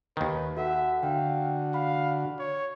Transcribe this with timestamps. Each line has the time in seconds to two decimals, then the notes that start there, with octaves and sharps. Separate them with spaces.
0.17 D#2 D#3 B4
0.57 F#4 A4 E5 F#5
1.03 D3 F#4 F5 G5
1.74 F5 B5
2.39 C#5